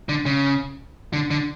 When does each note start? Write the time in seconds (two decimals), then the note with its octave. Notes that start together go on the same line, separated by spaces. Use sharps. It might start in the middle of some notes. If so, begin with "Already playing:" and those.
0.09 D3
0.26 C#3
1.13 D3
1.30 D3